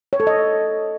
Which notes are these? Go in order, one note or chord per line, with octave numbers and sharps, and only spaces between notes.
C#5
A4
D#5